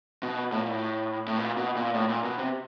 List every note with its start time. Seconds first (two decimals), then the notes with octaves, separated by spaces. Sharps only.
0.23 B2
0.52 A2
0.60 A#2
0.68 A2
1.28 A2
1.38 A#2
1.57 B2
1.76 A#2
1.95 A2
2.09 A#2
2.24 B2
2.38 C3